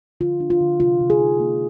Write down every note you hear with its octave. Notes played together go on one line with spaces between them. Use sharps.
D3 F4
D4
F4
D3
C3 F4
C3
G#4
D#4
A#3